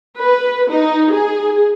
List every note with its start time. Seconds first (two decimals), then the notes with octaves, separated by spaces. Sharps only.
0.20 B4
0.71 D#4
1.13 G#4